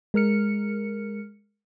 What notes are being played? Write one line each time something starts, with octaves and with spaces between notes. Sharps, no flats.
G#3 A#4 F6 C#7